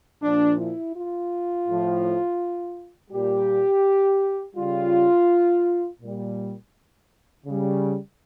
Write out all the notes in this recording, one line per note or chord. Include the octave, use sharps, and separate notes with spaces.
A#2 F3 D4
E4
F4
A2 F3
A#2 G3 G4
C#3 G3 F4
A#2 G3
C#3 G3